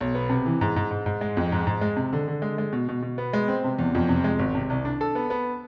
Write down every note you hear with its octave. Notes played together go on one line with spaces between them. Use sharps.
B1
B3
C3
E3
G#2
G#2
G#2
G#2
G#3
F2
G#2
G#2
G#3
C3
D3
D3
G#3
G#3
B2
B2
B2
B3
G#3
C4
C3
E2
F2
C3
G#3
G#1
C3
C2
D4
A4
B3
B3